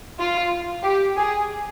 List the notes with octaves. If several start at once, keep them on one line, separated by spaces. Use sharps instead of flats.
F4
G4
G#4